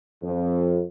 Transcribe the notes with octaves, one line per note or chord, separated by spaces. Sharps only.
F2